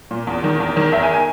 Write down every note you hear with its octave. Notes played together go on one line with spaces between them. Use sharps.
A#2
E2
D#3
E2
D#3
E2 E5
G#5
G#5